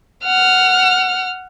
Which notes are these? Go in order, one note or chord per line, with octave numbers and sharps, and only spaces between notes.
F#5 F6